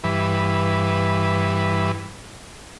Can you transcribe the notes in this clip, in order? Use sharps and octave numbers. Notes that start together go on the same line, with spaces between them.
G2 E3 B4